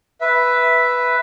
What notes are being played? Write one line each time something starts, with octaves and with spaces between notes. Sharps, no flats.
B4 E5